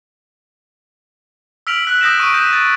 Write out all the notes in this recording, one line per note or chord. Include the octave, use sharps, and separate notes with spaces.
E6 F6 B6 D7 F7 F#7
E6 F#6 B6
D#6 E6 G6 A#6 B6 E7
C#6 D7 D#7
G6 B6
A6